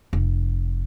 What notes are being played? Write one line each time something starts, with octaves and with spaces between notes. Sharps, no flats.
F1